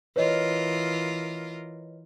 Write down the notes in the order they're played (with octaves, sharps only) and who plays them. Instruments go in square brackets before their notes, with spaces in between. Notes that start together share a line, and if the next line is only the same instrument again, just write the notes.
[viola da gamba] E3 F4 A#4 [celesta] B4 C#5 D#5